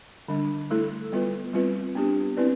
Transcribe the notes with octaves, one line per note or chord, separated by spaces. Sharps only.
D3 G3 D4
A3 E4 A4
G3 B3 F4 B4
G3 C4 F4 B4
B3 D4 G4
C4 E4 B4 D5